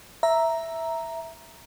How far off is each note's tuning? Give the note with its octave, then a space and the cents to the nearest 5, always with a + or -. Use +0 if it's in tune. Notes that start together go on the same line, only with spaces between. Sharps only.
E5 +0 A#5 +0